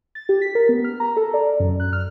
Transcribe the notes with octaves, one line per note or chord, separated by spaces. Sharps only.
A6
G4
B6
A#4
B3
F6
A#5
A4
D5
F#2
F#6
F6